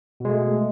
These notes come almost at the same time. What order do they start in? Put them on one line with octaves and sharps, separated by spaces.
B2 G#3 A3